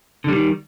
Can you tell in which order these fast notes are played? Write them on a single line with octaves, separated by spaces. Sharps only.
D3 G3 D#3